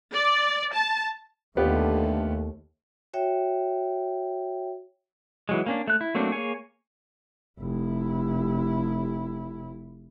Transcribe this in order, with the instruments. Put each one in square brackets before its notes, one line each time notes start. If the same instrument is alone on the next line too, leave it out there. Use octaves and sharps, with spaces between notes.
[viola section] D5
A5
[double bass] D#2 [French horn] D3 [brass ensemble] A3 [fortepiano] B3 F4 G4
[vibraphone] F#4 C#5 E5 G5
[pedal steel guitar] E3 F#3 G#3
A#3 C#4 D4
A3 F#6
E4
F#3 A3 A#3 C4 D4
A#3 G#4 C#5 G#5
[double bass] F1 E4